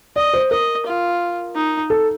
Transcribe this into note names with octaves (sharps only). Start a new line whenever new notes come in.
D5 D#5
C5
A#4 D#5
F4
D#4
A4